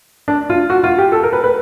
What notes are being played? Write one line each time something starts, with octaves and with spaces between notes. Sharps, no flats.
D4
F4
F#4
F4
G4
A4
A#4
B4
B4